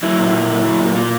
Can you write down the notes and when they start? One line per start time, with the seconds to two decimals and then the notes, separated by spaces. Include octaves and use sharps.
0.03 F#3 E4
0.18 A#2
0.33 A#2
0.49 F#3
0.64 F#3
0.80 A#2
0.95 A#2 F4